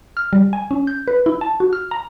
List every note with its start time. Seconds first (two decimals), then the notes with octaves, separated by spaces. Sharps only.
0.17 F6
0.33 G3
0.53 G#5
0.71 C#4
0.87 G6
1.08 B4
1.26 E4
1.41 A5
1.60 F#4
1.73 F6
1.91 A#5